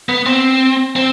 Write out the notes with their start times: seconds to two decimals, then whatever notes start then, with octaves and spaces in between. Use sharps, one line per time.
0.09 B3
0.26 C4
0.96 C4